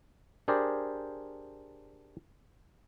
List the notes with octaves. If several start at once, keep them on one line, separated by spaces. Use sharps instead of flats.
D4 G4 G#4 A#4 C5 D5